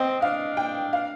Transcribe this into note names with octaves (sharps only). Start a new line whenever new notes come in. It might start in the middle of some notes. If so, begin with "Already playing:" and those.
Already playing: C4 D#5 G5
D4 F5
G5
F5